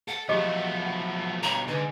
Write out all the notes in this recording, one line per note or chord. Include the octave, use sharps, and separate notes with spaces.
A4 F#5
F3 F#3 A3 B3 G4 G#4 D#5
G2 B2 C#5 A#5
G#2 D3 B4